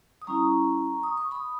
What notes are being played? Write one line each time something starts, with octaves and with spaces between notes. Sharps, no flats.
D#6
G3 C#4 E4 A#5 C#6
D#6
C#6
B5 D#6